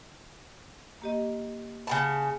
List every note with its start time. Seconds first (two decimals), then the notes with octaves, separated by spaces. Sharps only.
1.02 A#3 G4 D#5
1.87 C#3 F#5 A5 B5